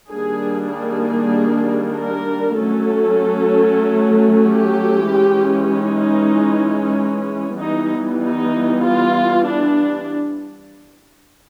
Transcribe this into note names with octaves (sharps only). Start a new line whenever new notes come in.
D#3 G3 A#3 D4 G#4
G#4
A#4
F#3 A3 C#4 A4
G4
E3 G#3 C#4
D#4
E3 G3 B3 D#4
D#4
F4
D4